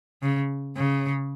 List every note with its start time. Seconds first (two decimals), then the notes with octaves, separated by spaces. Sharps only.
0.22 C#3
0.77 C#3